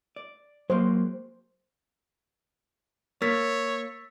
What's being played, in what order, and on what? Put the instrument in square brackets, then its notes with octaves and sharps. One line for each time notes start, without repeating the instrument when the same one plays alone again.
[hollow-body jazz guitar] D5
[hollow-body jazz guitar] F#3 G#3 A#3 [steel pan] C5
[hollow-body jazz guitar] A#3 [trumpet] C#5 [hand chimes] E6 A6 B6